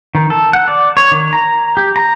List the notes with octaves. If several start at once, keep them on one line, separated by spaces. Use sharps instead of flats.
D#3
A4
F#5
D5
C#5
D#3
A#5
G4
A#5